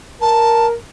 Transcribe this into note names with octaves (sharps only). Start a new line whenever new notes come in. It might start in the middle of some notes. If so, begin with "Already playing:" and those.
A#4 A5